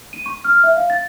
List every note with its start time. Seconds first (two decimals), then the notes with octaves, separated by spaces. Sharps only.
0.13 D#7
0.26 C#6
0.44 F6
0.63 E5
0.76 F5
0.90 A6